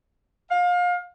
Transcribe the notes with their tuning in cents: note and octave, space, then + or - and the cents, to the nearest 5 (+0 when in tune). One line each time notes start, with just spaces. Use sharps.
F5 +30